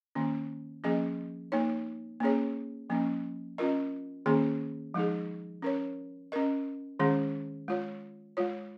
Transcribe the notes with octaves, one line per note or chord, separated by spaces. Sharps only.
D#3 A#3 C#4
F3 A#3 C#4 G#4 D#5
A#3 D#4 C#5
A#3 C#4 G#4 C#5
F3 A#3 C#4
C#4 F4 A#4 D#5
D#3 A#3 C#4 G#4
F3 G#3 D#4 G#4
C#4 A#4 C#5
C#4 A#4 D#5
D#3 G#3 C#4 G#4
G#3 F4 C#5
G#3 F4 C#5